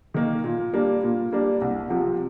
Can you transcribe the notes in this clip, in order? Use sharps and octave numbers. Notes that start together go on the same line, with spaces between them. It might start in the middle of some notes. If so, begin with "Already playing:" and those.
D#3 A#3
A#2
G3 A#3 D4
A#2
G3 A#3 D4
C2
C3 F3